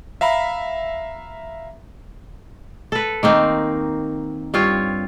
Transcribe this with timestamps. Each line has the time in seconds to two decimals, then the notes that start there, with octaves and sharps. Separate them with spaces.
0.21 E5 F5 A#5 B5
2.92 A4 B4
3.23 D#3 A#3 C4 D#4
4.54 G2 C4 F4 C#5